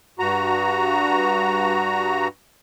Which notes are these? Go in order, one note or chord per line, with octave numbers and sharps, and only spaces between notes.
G2 F#4 A#5